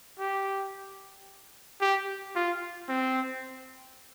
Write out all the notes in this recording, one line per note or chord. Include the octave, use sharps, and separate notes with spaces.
G4
G4
F4
C4